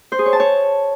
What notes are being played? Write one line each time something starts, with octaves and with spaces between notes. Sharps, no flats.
C5
G#4
C#5
A5
C#5